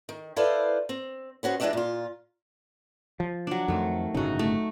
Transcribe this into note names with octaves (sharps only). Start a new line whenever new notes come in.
D#3
E4 A4 B4 C5 D5 F5
C4
B3 C#4 F#4 C5
E3 G#3 A#3 D4 D5 E5
A#2 F4
F3
F#3 D4
F2 D#3 A3
G1 A2 C#3 D#4 F#4
A3